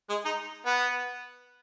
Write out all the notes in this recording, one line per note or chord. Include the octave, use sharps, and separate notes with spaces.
G#3
D#4
B3